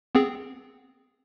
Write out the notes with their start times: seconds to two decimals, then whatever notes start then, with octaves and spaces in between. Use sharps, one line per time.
0.15 B3 C4 G#4